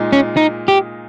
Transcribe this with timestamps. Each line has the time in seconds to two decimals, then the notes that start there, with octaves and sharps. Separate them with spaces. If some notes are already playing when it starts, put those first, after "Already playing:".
Already playing: A#2 G#3 D#4
0.12 C#4
0.37 D#4
0.68 G4